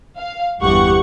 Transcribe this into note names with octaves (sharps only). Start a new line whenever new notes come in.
F5
G1 E2 G4 F#5 C#6